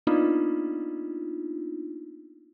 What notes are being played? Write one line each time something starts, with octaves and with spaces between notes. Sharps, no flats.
A#3 B3 D4 D#4 F4